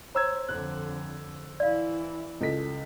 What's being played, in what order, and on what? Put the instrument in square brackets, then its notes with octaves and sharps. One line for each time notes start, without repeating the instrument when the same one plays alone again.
[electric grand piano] C5 E6 G#6 [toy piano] C#5 A#5
[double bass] F2 D3 [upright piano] F#6
[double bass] E3 E4 [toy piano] D5 F5
[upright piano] C#2 A4 B6